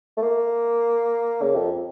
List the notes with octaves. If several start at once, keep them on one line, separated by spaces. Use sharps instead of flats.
A3
A#3
C#3
F2